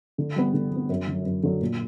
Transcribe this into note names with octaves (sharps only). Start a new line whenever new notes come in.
D3
G3 B3
D3
G3 B3
F#2
D3 F#3
F#2
D3 F#3
A#2